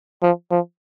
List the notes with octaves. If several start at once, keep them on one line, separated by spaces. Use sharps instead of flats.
F3
F3